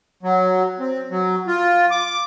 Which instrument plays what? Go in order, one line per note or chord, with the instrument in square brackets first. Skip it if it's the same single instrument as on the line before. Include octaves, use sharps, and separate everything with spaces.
[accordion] F#3
C4
F#3
F4
D6